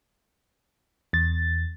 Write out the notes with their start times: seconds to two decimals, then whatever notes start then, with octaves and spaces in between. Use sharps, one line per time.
1.13 E2 A6